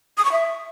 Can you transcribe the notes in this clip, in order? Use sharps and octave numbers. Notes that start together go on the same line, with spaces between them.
D#6
C#6
E5